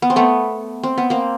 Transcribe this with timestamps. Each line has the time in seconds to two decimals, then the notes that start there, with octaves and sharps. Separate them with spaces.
0.02 B3
0.10 C4
0.16 A3 B3
0.83 C4
0.98 B3
1.10 A#3 C4